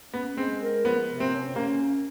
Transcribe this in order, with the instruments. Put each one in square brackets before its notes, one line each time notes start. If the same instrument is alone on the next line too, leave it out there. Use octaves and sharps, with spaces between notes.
[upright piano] B3 [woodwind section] C#4
[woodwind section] G#3 [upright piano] C4
[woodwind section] A#4
[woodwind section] F3 [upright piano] B3
[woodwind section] C3
[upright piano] C4
[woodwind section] C#4
[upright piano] A#3 [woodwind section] C#4